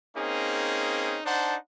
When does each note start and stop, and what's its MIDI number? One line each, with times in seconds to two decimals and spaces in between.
0.16 1.20 58
0.16 1.20 60
0.16 1.20 61
0.16 1.20 63
0.16 1.20 68
1.24 1.55 62
1.24 1.55 63
1.24 1.55 72
1.24 1.55 78
1.24 1.55 81